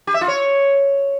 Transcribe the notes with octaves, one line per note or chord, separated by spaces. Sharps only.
G4
E5
F4
C#5